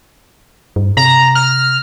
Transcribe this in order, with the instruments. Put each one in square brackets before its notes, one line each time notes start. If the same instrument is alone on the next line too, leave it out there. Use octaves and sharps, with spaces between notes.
[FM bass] G2
[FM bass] C3 [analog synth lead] A#5
[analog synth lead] F6